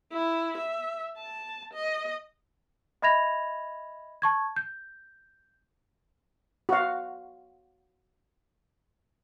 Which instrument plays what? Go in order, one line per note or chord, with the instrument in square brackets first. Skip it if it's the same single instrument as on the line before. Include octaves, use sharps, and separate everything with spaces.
[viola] E4
E5
A5
D#5
[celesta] D#5 E5 B5 G#6 A#6 F7
A5 C#6 G#6
G6
[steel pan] F#4 F5